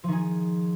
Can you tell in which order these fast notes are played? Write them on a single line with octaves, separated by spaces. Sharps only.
F3 D#3 G#4